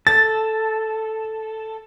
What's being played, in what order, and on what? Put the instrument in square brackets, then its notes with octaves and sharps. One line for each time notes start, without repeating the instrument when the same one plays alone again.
[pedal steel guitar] A4 [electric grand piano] A6